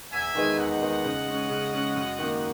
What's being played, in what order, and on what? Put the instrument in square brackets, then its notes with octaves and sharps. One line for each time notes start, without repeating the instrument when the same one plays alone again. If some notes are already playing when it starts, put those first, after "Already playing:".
[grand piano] E2 [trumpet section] E5 G#5
[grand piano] D#3 G#3 B3 D#4
[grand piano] E2 [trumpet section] D#5 F#5
[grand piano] D#3 G#3 B3 D#4
C#3
G#3 C#4
C#3
G#3 C#4
F#2
D#3 A#3